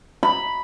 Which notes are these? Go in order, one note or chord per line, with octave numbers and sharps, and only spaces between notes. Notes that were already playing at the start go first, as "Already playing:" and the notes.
B5